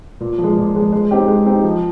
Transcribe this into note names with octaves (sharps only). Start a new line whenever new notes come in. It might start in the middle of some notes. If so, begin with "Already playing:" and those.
A#2
F3
G#3
A#2
F3 G#3
G#3
C4 D#4 G4
G#3
C4 D#4 G4
F3